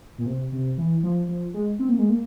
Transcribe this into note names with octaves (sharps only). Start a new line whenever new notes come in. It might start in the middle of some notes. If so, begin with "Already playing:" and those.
A#2
C3
C3
E3
F3
F3
G#3
C4
A#3
G#3
A#3